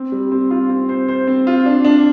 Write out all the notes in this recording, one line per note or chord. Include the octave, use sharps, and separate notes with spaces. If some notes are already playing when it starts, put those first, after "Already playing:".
Already playing: C4
G3
C4
F4
C4
C5
C5
C4
F4
D4
D4